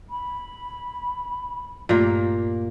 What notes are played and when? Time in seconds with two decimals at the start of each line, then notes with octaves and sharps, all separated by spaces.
0.10 B5
1.89 G2 A#2 A3 A#3 G4